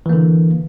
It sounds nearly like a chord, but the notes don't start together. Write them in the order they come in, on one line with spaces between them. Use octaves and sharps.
E3 A#3 D3